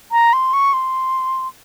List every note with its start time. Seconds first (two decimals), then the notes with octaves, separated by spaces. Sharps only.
0.12 A#5
0.33 C6
0.53 C#6
0.73 C6